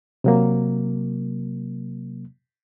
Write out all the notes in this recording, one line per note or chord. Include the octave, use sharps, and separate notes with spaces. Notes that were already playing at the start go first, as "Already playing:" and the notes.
C3 F#3 A#3